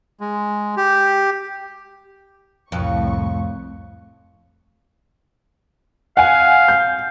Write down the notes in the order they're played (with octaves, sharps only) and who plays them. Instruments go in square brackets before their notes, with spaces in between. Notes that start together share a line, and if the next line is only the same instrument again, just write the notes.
[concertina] G#3
G4
[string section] C2 A2 C#6 [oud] F2
[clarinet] F5 [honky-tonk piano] F#5 G#5
[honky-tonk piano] G6